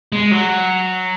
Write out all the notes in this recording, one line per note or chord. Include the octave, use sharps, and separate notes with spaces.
G#3
F#3